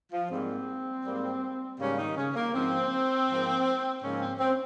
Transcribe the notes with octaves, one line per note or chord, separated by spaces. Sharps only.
F3 F4
G#2 G3 A#3 C4
G#2 G3 A#3
G#2 C#3 G3 A#3 C#4
D#3 D#4
C#3 C#4
A#3
G#2 F3 A#3 C4
G#2 F3 A#3
G#2 C#3 F3 A#3 C#4
C4
C4